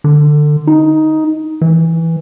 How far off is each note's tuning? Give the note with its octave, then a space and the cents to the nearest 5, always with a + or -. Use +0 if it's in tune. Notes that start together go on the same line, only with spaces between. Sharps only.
D3 +20
D#4 +10
E3 -5